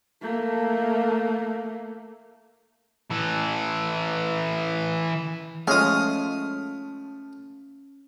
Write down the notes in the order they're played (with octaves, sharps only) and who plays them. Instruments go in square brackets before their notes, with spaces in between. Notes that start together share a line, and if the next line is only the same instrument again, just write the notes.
[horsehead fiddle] A3 A#3
[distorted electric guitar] E3 A4
[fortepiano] F3 A3 [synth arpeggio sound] G#3 [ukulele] C#4 [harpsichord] F5 D#6